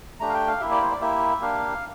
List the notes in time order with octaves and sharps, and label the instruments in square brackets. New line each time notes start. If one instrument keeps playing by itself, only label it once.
[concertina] A3 D4 G4 A#5
F5
G5
F5
A#3 E4 G4 E5
D5
C5
D5
A#3 E4 G4 E5
A#3 D4 G4 F5